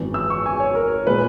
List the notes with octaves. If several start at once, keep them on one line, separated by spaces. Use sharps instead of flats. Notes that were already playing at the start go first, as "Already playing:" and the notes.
Already playing: G#1 F#2 E3 G#3 B3
E6
C#6
G#5
C#5
A#4
A#2 G#3 B3 B4